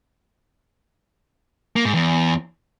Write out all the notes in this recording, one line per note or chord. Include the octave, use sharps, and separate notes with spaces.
A#3
G#2
E2